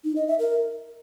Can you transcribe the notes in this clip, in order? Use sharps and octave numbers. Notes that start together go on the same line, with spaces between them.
D#4
D#5
E5
A#4